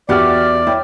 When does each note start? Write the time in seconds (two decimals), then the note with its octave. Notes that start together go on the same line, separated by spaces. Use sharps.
0.09 E2 E4 F#4 G4 D5 F6 A6
0.67 E4 C#5 G5